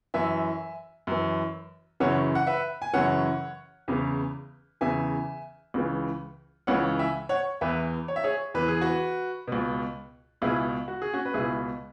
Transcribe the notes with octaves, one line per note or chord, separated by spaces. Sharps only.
F#2 E3 E5 G#5
F#2 E3
F#2 C#3 E3 C#5 F#5
F#5
B4 E5
G#5
F#2 C#3 E3 C#5 F#5
E2 C#3 E3
E2 C#3 E3 E5 G#5
C#2 C#3 E3
C#2 C#3 E3 C#5 F#5
E5 G#5
C#5 F#5
E2 E3 B4 E5
C#5
E5
G#4 C#5
E2 E3 B4
G#4
F#4 B4
C#2 B2
C#2 B2 E4 G#4
F#4
G#4
C#4 F#4
B4
C#2 B2 E4 G#4